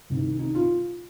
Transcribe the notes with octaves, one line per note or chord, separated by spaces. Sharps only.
C2 C3 D#3
D#4
F4